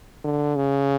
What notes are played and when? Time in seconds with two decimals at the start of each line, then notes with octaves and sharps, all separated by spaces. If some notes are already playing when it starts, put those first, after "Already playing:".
0.24 D3
0.56 C#3